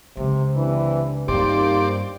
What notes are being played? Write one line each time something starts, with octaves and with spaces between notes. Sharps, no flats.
C#2 C3
C3 E3 D4
G2 F3 A#3 C4 D#4 G4 D5